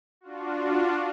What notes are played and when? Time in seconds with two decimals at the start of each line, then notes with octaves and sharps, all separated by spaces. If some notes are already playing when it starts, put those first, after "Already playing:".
0.21 D4 F4 F#4